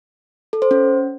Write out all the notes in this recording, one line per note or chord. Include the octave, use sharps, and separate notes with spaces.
A4
C5
C#4